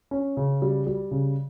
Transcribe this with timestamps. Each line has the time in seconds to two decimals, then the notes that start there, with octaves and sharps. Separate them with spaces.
0.11 C#4
0.37 C#3
0.62 G3
0.87 G3
1.11 C#3